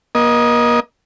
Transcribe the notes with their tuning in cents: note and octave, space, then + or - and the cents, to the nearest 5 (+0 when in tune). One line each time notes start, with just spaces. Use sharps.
A#3 +35 D#5 +0